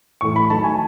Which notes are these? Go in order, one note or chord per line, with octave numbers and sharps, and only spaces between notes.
A2 E3 A3 C#6
B5
D#3 F#3 A3 A5
G#5